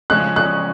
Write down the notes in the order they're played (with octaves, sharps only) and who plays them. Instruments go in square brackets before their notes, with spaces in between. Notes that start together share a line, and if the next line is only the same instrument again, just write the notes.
[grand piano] C#3 F3 G#3 C#4 [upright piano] F#6
[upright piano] F#6